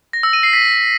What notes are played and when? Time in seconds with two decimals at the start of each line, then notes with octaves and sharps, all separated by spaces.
0.13 A#6
0.23 E6
0.33 D#7
0.43 C7
0.53 B6